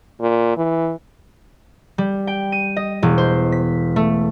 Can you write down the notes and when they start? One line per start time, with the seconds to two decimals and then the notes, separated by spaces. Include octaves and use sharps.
0.21 A#2
0.57 E3
1.98 G3
2.27 G5
2.52 D#7
2.77 D#5
3.02 E1
3.18 C5
3.52 B6
3.96 A3